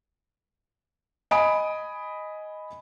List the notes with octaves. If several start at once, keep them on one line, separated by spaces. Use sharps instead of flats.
D#5 G#5 B5 D#6 D7